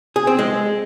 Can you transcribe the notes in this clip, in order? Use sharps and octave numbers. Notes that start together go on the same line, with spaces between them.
G#4
C4
G#3